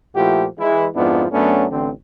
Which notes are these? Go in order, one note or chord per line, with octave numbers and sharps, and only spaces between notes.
A#2 F3 A3 E4 F#4 G4
E3 G#3 E4
F2 G#2 F3 B3 D4 E4
F#2 F#3 A3 B3 C#4 D4
A1 D3 C4